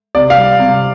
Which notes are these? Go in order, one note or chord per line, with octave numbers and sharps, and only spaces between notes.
C3 D5
F5
G3
C3